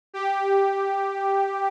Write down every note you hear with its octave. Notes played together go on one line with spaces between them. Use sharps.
G4